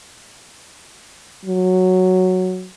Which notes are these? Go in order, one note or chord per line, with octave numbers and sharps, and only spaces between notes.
F#3